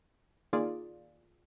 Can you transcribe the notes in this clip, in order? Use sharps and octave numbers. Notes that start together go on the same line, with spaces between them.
D#3 A#3 F4 G#4 D5